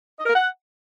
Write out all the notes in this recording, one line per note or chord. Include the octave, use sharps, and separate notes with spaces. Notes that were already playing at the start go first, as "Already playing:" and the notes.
D#5
A#4
F#5